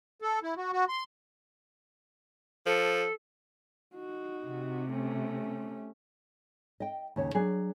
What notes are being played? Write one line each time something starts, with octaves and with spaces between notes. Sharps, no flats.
A4
E4
F#4
F#4
C6
F3 A4
D#4 F#4
C3
A3 C#4
D#5 G5
D#2 C#3 C#5
F#3 D4 G#4